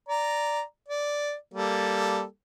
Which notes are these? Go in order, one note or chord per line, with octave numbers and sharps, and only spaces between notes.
D5 A#5
D5
G3 A#3 A4